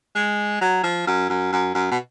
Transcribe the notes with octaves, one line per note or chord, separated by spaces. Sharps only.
G#3
F#3
F3
F#2
F#2
F#2
F#2
B2